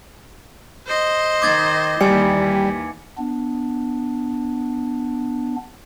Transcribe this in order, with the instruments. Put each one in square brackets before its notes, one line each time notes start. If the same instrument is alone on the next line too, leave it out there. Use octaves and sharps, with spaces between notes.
[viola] C5 D#5
[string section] D#3 [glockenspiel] D6 G#6 A6
[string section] D#2 E3 [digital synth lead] G3 [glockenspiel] G#5 C#7
[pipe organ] B3 D4